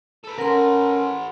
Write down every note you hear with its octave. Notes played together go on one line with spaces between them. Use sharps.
A4 B4
C#4 A#4 F#5 C6